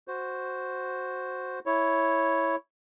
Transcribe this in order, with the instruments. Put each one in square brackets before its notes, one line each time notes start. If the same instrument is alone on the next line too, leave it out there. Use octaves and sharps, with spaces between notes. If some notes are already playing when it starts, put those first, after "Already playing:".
[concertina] F#4 C5
E4 C#5